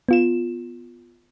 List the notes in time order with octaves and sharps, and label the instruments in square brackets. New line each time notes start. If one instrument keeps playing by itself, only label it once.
[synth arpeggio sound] B3 F4 E7